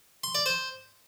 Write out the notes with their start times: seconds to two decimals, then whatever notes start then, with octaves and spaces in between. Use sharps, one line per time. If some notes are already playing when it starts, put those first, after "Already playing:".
0.24 C6
0.35 D5
0.46 C5